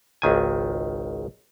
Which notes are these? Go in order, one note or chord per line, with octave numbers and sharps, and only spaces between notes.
G#1 C#2 D#3 G#5